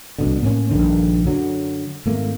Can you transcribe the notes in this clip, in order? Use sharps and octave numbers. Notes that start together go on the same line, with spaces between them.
C2 B2 D3
A2 A#3 C#4
A#1 G2 D3 D#3
F#2 D3 F#3
G#1 A3 A#3